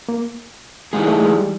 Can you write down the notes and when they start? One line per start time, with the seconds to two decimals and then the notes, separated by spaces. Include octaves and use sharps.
0.09 A#3
0.93 E3 G3 G#3 C4 D#4 G#4
1.08 A3
1.22 G#3
1.36 G3